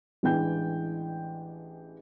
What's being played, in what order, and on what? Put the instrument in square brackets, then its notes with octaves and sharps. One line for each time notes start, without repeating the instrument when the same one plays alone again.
[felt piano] A1 E3 G#3 D4 G5 G6